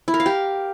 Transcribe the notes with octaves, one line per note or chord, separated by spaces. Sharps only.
E4
A#4
F5
G4